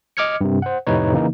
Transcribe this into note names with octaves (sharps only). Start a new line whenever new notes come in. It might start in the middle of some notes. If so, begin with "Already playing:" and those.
D#5 D6 F6 G#6 C#7
G2 C3
C5 F#5
F2 A2 C3 D#4 B4 C#5
C#3 E3 A#3 D#4